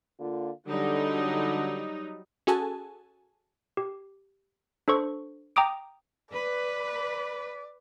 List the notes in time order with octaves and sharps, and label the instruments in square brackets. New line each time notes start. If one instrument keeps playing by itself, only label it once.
[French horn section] D3 A#3 F4
[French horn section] D3 [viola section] F#3 G3 D#4
[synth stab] C#4 F#4 G#4 A4 G#5 A5
[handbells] G4
D4 A4 C5 C#6
G5 A#5 D6 D#6 D7
[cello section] B4 [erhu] D5